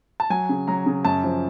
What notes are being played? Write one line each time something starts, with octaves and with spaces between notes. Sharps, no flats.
A5
F#3 G#5
C#3
F#3 A#5
C#3
F#2 A5
F3